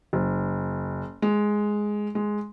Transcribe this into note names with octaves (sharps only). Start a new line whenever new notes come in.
F#1
G#3
G#3